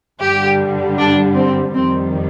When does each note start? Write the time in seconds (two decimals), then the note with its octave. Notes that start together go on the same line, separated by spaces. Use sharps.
0.21 G2 D3 G3 G4
0.99 D4
1.36 C4
1.74 F2 D#3 G3 C4